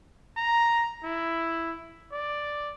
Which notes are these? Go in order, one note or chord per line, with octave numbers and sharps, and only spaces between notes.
A#5
E4
D5